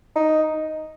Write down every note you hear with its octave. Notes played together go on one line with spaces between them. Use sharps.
D#4